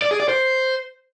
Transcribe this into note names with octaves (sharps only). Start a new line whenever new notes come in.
D5
G#4
D5
C5